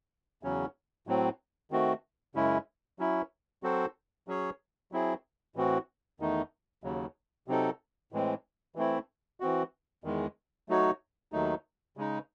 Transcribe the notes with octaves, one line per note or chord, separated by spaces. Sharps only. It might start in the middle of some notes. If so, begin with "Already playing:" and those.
E2 C#3 F#3 C#4
A2 F#3 C4
D#3 A3 C4 F#4
F#2 C#3 G#3 C#4 E4
F#3 C#4 E4
F#3 C4 F#4 A4 C5
F#3 C#4 G#4 C#5
F#3 C4 E4 G#4
A2 E3 C4 F#4
E2 D#3 A3 D#4
D#2 C#3 F#3
C3 F#3 C4 D#4 A4
A2 E3 G#3 C4
E3 A3 C4 E4
E3 C4 F#4
E2 D#3 G#3
F#3 A3 D#4 F#4 C#5
D#2 D#3 F#3 A3 D#4
C#3 G#3 D#4